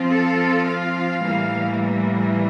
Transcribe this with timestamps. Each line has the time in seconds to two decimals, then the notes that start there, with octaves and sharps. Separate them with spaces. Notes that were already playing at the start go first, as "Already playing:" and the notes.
Already playing: F3 C4 F4
0.12 A4
0.66 F5
1.21 A2 E3 G3 A#3